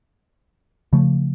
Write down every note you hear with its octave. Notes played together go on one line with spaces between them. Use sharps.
C#3 F3 A3